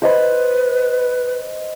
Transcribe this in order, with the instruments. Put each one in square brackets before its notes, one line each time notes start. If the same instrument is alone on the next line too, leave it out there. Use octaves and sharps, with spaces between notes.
[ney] B4 [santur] C5 D#5 B5